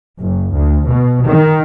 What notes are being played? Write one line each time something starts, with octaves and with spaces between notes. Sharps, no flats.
F#1
D2
B2
D#3